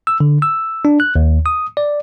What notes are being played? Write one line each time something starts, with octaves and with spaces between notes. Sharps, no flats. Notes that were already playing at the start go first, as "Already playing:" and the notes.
E6
D3
E6
D4
F#6
D#2
D#6
D5